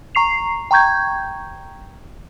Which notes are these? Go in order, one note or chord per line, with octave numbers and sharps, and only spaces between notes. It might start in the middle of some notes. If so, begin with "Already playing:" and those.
A#5 C#6 C7 F7
G5 A#5 C#6 G6 G#6